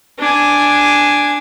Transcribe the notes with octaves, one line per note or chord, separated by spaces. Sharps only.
D4 G#5